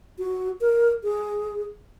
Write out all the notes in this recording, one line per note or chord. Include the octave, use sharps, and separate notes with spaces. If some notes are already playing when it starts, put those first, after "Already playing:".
F#4
A#4
G#4